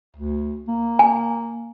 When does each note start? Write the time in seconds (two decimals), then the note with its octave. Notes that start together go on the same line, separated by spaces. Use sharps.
0.16 D2
0.68 A#3
0.99 G#5